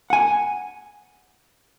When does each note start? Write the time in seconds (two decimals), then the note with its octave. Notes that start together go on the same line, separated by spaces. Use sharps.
0.10 F#5 G#5